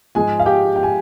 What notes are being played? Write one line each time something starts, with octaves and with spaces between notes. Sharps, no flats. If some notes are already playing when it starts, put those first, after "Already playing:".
G#2 F3 G#3 G#4 G#5
F5
G4 G5
G5
G#5